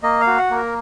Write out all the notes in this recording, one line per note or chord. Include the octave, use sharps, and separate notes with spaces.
A#3 D#5
F5
F#4
F#5
A#3
A#4